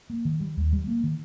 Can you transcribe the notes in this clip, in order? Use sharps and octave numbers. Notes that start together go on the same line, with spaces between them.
A#3
D#3
G3
D#2
G3
A#3
D#3